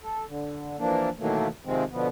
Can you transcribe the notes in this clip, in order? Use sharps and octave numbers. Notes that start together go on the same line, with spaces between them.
A4
D3
E3 F3 A#3 D4
B2 D#3 E3 F#3 A3 A#3
C3 D#3 F3 G#3 C4
B2 D3 F3 B3